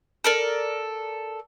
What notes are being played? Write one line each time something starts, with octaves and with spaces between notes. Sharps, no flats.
A4 A#4 D5